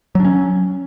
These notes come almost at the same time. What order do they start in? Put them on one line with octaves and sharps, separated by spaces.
F#3 D4 C#4